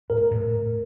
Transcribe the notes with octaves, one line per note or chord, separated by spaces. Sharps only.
A2 A#4
A2